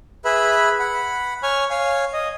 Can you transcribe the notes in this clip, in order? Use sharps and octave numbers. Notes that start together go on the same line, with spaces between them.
G#4 B4 E5 B5
F#5 B5
C#5 G#5 C#6 F6
C#5 F5 G#5
D#5